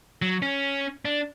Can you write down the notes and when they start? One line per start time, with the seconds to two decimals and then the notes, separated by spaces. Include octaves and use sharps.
0.22 F#3
0.42 C#4
1.05 D4